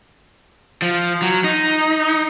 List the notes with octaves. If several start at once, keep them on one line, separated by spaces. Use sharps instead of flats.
F3
F#3
D#4